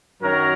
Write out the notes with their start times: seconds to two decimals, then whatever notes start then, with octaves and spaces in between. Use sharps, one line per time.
0.22 F#2 D#3 F#3 A#4 C#5